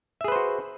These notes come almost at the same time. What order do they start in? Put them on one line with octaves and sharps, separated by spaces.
E5 G#4 B4 C5 F#4